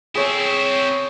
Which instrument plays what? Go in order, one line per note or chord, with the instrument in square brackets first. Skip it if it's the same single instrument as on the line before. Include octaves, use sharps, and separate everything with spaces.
[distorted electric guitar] C4 E4 [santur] G#4 C#5 E5